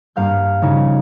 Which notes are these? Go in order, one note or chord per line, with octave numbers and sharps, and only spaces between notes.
G2 A#3 F5 F6 G6
A#1 C#3 D#4 G#6